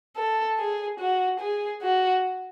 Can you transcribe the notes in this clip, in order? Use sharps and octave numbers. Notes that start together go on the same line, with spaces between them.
A4
G#4
F#4
G#4
F#4